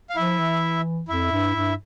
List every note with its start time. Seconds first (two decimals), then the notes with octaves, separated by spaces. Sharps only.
0.10 F5
0.16 F3 E4 E5
0.39 E3
1.08 F2 E4 E5
1.31 G2
1.55 G2